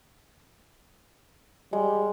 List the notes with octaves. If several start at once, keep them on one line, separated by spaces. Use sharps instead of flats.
G3 G#3